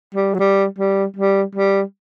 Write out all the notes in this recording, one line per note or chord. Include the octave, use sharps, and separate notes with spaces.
G3
F#3
G3
G3
G3
G3